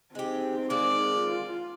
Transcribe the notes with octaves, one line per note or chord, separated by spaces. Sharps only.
G#3 C4 D#4 G4
G#3 A#3 D5
F4